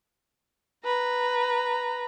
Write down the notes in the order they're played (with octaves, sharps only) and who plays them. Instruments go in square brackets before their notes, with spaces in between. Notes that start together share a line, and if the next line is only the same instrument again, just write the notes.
[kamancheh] B4 A#5